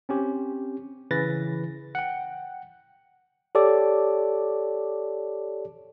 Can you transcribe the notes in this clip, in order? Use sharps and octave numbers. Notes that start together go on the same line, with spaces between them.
C4 C#4 G4
C#3 E3 B4 A6 A#6
F#5 G5
G4 A4 C#5 D5 D6